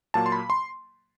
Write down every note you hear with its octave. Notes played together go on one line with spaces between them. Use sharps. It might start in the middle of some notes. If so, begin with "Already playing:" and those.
A#2 F#3 A#3 A5
C6
B5
C6